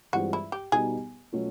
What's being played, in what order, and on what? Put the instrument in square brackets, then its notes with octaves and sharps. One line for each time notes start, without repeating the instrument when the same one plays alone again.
[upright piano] G2 E3 G#3 C4 F4 [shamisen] F#4
[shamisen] E4
G4
[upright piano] B2 G3 B3 D#4 G4 [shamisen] G#4
[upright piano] B2 F#3 A3 C#4 F4